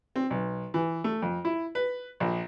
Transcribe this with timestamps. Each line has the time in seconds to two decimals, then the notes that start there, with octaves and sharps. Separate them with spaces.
0.16 C4
0.30 B1
0.74 E3
1.04 A3
1.22 F2
1.45 E4
1.75 B4
2.20 A#1